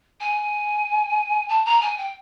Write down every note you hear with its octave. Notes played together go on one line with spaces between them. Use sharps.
G#5
A5
A#5
G#5
G5